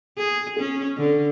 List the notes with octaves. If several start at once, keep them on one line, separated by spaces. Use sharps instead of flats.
G#4
C#4
D3